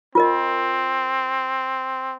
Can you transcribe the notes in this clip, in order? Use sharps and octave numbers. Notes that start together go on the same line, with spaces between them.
C4 F4 A#4 D#5